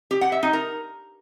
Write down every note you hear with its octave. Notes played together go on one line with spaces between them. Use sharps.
G4
F#5
E5
D#4
A#4